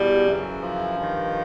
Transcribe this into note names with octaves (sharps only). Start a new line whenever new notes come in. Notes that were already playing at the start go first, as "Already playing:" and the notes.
Already playing: E2 B2 G3
F#2 C#3 E3
F3
G2 D#3